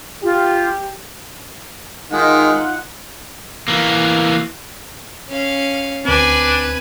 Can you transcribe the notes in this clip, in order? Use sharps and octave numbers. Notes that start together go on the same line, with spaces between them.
F4 G4
D#3 G#3 D#4 F4 F#5
E3 A#3
C#4 F5
D2 C4 D4 B4 G#5